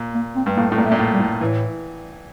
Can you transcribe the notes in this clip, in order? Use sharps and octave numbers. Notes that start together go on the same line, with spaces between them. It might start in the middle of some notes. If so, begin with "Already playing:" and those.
Already playing: A#2
A#3
C4
G2
A2 A#3
A2
A#2 A#3
A3
A#2
A2
G3
A2
A2 E3